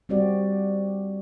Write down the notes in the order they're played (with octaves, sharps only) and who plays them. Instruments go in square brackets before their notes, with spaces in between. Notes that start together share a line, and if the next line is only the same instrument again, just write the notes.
[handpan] G3 C4 F#4 G4 D5